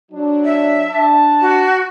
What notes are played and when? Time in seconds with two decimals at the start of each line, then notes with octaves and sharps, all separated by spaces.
0.12 F#3 D4
0.45 E5
0.89 D4 A5
1.42 F#4